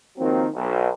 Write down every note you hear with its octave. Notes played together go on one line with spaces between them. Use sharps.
D#3 F3 F#3 A#3 C4
B1